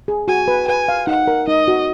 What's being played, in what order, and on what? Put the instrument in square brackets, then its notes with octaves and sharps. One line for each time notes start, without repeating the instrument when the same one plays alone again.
[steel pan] G#4
[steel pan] F#4 [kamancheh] G#5
[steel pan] B4
[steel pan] B4 [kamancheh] G#5
[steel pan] F5
[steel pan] D#4 [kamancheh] F#5
[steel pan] A#4
[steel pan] D#4 [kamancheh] D#5
[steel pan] F#4